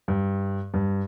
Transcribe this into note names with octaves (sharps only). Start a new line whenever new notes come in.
G2
G2